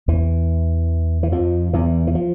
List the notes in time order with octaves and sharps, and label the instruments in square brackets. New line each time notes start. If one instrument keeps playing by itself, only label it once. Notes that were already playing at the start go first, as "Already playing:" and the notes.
[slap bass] E2 E3
E3
F2 F3
E2 E3
E3
F3